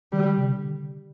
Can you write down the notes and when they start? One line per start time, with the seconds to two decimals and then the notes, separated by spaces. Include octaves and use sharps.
0.12 D#3 G3
0.25 D3
0.38 C3
0.49 D3